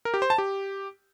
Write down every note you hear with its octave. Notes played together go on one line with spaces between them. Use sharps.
A#4
G4
C5
A5
G4